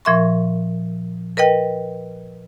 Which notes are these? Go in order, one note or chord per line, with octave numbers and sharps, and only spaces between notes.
A#2 F3 A#4 E5 C6 C#6
A#4 B4 D#5 G5